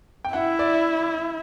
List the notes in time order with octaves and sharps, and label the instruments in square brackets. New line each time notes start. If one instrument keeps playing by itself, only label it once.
[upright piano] G5
[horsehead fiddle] E4 [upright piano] E5 F#5
[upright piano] D5 E5